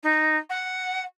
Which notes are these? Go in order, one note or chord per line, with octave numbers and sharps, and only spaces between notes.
D#4
F#5